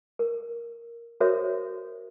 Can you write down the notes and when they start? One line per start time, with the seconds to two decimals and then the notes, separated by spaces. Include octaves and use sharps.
0.19 A#4
1.20 F#4 A4 A#4 C5 C#5 E5